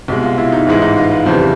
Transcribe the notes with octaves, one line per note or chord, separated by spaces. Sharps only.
C2 B2 G#3
F4
E4
D#4
A1 G#2 E3 G#3 E4
D#4
F4
B4
F2 C#3 E3 G3 C5